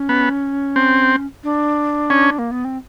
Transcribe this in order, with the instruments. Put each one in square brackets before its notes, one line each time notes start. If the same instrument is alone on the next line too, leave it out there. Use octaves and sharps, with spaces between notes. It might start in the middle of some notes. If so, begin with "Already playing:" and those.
Already playing: [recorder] C#4
[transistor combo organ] B3
C4
[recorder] D4
[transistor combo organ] C#4
[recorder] A#3
B3
C4